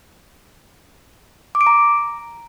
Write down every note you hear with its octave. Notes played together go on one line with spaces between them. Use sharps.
D6
D7
A#5